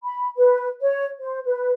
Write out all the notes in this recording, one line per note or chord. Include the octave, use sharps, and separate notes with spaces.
B5
B4
C#5
C5
B4